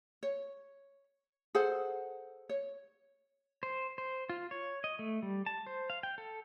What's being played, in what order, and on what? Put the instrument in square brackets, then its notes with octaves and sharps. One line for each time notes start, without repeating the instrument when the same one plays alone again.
[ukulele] C#5
G#4 A4 C5 F#5
C#5
[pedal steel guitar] C5
C5
F4
C#5
D#5
A3
G3
A5
C5
F5
G5
A4